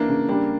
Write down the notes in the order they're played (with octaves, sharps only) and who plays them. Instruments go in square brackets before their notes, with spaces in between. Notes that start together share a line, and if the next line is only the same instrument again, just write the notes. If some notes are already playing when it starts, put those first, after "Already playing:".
Already playing: [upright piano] E3 [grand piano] A#3 D4
[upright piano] C#3
[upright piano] G3 [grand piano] A#3 D4